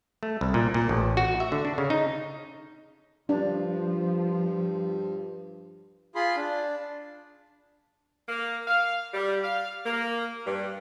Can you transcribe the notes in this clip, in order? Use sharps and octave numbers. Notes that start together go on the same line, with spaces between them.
A3
C2
A#2
A#2
A1
F#4
E5
D3
D4
C#3
D#4
G2 F3 D4
F4 G#4 B5 C6
D4
A#3
F5
G3
F5
A#3
G2